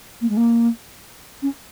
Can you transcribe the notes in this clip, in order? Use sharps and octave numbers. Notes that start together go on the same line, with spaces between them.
A#3
G#3
A#3
C#4